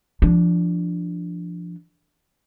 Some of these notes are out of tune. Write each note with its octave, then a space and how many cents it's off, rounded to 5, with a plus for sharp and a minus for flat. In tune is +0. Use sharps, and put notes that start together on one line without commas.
F3 -20 D4 +0